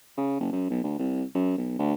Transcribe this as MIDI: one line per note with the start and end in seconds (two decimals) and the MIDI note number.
0.17 0.39 49
0.40 0.50 30
0.52 0.66 42
0.70 0.80 35
0.84 0.95 38
0.99 1.23 36
1.35 1.55 42
1.58 1.77 35
1.79 1.94 38